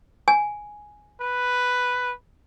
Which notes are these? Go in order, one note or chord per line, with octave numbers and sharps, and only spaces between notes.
G#5
B4